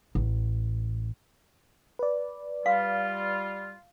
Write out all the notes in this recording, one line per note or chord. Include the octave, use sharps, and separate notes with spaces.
A1
B4 D5
G3 F4 F5